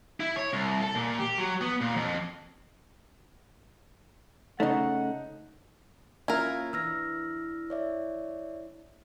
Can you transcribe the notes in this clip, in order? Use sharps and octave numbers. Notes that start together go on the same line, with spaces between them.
E4
C#5
C2
A4
A#2
G4
F#3
B3
A#2
F2
C#3 A3 D#4 C#5 D#5 F#5
A#3 C#4 E4 F4 A#4 G#6
E3 D4 E6 F6 A#6
C#5 D5 E5